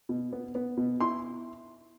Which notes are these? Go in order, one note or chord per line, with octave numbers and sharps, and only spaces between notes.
B2
B3
B3
B2
E4 C6